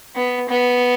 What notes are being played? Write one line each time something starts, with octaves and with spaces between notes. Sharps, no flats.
B3
B3